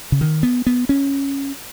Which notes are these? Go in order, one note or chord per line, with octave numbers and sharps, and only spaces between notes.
C#3
D#3
B3
B3
C#4